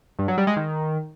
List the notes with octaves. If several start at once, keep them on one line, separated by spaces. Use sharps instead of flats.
G2
F#3
G3
G#3
D#3